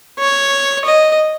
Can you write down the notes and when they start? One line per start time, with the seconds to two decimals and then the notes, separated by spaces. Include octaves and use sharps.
0.19 C#5
0.85 D#5